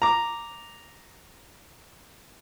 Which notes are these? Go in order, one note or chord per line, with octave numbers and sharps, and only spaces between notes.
A#5 D6